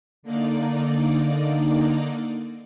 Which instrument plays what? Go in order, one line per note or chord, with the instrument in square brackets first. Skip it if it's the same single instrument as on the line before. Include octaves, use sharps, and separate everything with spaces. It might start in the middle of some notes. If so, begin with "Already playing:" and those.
[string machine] D3 A#3 D#4 D5